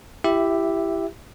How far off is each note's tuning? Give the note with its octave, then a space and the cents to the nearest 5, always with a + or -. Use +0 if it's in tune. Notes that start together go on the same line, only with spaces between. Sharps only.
E4 +20 G4 +0 E5 +0